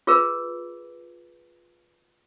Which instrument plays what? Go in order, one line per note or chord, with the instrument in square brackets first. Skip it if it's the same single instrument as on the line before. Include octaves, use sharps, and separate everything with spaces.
[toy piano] F4 G#4 A#4 B4